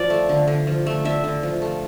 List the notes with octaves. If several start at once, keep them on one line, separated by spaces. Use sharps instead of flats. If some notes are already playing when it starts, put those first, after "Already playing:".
Already playing: F3 D5
A3
D3
D3
F3
A3
D3 E5
D3
F3
A3